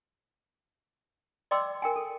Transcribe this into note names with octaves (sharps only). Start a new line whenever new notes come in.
D5 D#5 G5 C6 D6 E6
A#4 G5 G#5
A4